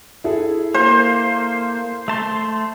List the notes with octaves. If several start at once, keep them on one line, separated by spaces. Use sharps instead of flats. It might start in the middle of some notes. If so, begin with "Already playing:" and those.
E4 G#4 A4
A#3 C5
A3 A5 C6